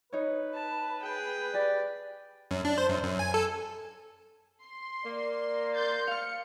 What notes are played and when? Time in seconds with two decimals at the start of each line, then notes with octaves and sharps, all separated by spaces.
0.13 D#4 B4 C#5
0.54 A5
1.01 G#4 G5
1.54 G4 D5
2.51 F#2
2.65 D4
2.78 C5
2.89 F#2
3.04 F#2
3.19 G#5
3.34 A4
4.64 C6
5.04 A#3 D5
5.75 C6 G6 A6
6.07 F5 F6 C#7